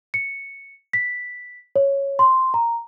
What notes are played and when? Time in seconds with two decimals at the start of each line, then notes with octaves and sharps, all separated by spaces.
0.14 C#7
0.93 B6
1.76 C#5
2.19 C6
2.54 A#5